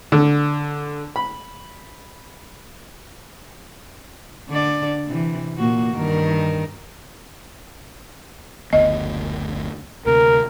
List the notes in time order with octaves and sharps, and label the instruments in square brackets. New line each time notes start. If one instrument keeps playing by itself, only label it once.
[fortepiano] D3
B5
[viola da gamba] D3 D5
C3 E3
A#2 A#3 F#4
G2 D#3 A#4
[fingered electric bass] F#1 D2 B3 [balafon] D#5
[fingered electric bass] D2 C3 [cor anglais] A#4